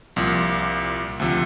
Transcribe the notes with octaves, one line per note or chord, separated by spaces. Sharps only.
C2 A#2 F3
D2 C3 F3